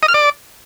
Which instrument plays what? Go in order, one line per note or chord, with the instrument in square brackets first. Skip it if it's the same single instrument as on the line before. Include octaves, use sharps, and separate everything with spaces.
[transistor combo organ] D#5
F6
D5